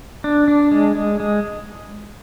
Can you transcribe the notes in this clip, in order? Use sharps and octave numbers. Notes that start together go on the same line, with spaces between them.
D4
D4
G#3
G#3
G#3